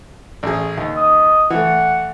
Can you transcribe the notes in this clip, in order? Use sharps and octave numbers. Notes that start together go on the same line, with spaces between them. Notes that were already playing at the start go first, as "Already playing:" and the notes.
A1 G#4
D#2
D#5
E3 A3 F#5